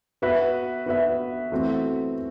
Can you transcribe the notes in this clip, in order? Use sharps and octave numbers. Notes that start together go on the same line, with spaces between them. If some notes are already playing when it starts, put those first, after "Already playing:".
B3 F#4 B4 E5
B3 F#4 B4 E5
E3 A3 C4 F#4